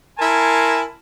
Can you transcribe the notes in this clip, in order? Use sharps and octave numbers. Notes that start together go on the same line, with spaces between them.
E4 A#4 G#5 A5 C6